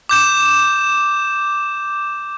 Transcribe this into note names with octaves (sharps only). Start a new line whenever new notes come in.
D6 G6 E7